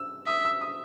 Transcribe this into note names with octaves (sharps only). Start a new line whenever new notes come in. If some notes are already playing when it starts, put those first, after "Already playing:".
Already playing: E6
E5 D#6
E6
D#6